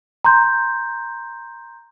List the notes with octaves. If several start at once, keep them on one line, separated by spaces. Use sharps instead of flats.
A#5 C6 G6